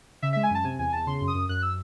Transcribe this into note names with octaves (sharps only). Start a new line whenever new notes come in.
C#3 E5
G#3 E5
G#5
F#2 A5
C3 G#5
E2 G#5
E2 A5
C#3 C6
F#2
D#6
F#2
F#2 F#6
E6